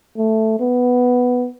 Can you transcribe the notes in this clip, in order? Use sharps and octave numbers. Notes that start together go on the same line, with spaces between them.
A3
B3